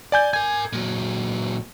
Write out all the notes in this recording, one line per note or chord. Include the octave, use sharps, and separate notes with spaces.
D5 G#5 G6
A#4 G#5 G#6
A#2 F#3